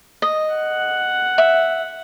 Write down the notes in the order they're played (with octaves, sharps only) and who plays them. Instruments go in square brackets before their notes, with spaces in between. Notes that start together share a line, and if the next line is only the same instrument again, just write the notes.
[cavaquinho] D#5
[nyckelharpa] F#5
[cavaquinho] E5